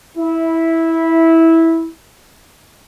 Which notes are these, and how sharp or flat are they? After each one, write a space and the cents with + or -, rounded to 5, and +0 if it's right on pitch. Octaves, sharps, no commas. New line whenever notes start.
E4 -10